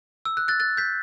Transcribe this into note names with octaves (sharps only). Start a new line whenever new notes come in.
E6
F#6
F#6 A6
F#6 A6
G6 B6